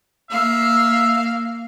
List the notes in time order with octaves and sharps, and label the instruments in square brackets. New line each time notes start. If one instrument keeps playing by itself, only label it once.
[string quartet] A#3 F5 [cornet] E5